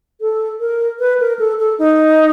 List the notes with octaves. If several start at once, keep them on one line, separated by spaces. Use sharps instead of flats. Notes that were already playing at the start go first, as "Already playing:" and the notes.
A4
A#4
B4
A#4
A4
A4
D#4